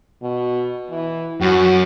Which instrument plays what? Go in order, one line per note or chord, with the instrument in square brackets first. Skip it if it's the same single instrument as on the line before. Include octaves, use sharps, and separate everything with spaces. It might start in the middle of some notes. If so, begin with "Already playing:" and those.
[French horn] B2
E3
[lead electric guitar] F#2 [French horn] F#4